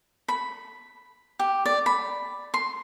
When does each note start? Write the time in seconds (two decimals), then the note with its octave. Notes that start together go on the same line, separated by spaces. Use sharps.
0.28 B5
1.39 G4
1.66 D5
1.86 B5
2.54 C6